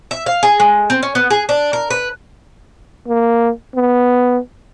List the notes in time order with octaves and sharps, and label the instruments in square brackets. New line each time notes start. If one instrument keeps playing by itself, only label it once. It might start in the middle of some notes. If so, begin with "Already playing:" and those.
[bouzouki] E5
F5
G#4
G#3
C4
C#4
B3
G#4
D4
A#4
B4
[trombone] A#3
B3